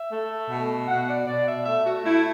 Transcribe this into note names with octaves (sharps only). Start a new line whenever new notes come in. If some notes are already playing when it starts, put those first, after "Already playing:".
Already playing: E5
A3
B2
B2 F#5
D5
B2 D5
E5
A3 E5
F#4
A3 E4